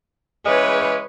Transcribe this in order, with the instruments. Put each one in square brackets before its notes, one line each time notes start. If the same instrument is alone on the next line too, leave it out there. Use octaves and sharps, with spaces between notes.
[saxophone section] C#3 E3 G#3 [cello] B4 C#5